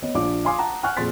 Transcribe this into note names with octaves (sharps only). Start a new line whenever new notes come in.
B3 C#5 D#5
A#1 D4 D6
F5 G#5 C6 D6 D#6
F#5 A5 A#5
F#5 G#5 C#6 F6 F#6
F2 A#2 G#4 C6 A6 B6